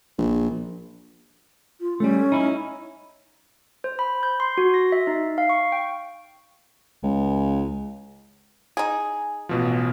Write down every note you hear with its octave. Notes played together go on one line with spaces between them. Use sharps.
A#1
F4
G3 A3 C#4
D#4 E4
C5
B5
G6
C6
F#4
A#6
E5
D#4
F5
C#6
G5
C#2
D#4 G#4
A1 B2 F3